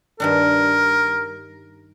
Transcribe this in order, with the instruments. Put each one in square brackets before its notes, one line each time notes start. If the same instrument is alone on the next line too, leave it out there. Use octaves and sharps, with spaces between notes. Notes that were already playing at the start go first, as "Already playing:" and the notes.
[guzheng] G2 D#3 D4 [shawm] A#4